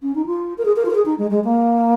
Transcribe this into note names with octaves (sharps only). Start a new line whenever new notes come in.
C#4
D#4
F4
A#4
G#4
A#4
F4
A#4
G#4
D#4
G#3
G#3
A#3